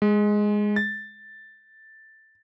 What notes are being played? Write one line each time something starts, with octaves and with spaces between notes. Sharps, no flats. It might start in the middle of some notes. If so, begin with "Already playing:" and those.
G#3
A6